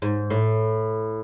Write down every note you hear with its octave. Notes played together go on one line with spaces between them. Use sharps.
G#2
A2